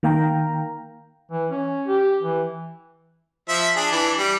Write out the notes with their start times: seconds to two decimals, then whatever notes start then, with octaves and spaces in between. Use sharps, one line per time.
0.03 D#3 A#3 F5 G5 A#5
1.32 E3
1.51 C#4
1.88 G4
2.23 E3
3.49 F3 E5
3.76 D4 G#4
3.92 E3 D4
4.19 G3